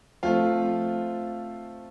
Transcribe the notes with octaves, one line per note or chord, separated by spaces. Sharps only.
F3 A3 C4 F4 F5